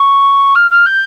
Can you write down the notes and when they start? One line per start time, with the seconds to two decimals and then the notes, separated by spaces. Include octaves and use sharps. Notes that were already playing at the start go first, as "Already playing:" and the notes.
Already playing: C#6
0.55 F6
0.71 F6
0.86 G6